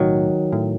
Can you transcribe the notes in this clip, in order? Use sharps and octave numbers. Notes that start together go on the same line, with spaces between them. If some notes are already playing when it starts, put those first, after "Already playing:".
Already playing: B1 A2 D#3 F#3
A2